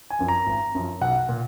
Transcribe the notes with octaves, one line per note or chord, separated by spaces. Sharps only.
G#5
F#2 F3
A#5
G#1
F#2 F3
B1 F#5
A#2